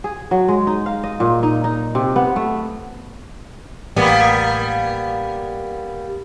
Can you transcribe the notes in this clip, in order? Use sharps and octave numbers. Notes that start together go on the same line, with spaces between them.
G#4
F#3
G#3
D#4
F5
D#5
A#2
D#4
D#4
C3
B3
A3
A1 G3 A#3 B3